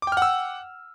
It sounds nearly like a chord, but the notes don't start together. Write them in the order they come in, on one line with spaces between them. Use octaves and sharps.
D6 G5 F6 F#5 E6